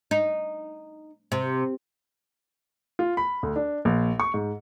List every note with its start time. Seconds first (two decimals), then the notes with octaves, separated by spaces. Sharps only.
0.11 D#4
1.32 C3
2.99 F4
3.17 B5
3.43 D2
3.56 D4
3.85 A#1
4.20 C#6
4.34 G#2